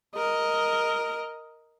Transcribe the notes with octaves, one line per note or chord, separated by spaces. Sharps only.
A#4 D#5